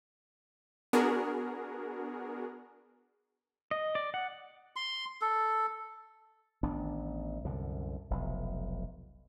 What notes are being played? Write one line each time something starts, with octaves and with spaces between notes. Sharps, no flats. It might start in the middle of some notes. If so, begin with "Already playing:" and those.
B3 D4 F#4 G#4 A#4
D#5
D5
F#5
C6
A4
A1 D#3 B3 D4
C2 F#2 D3
F1 B1